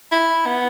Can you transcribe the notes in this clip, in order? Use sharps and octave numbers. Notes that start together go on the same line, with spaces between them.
E4
B3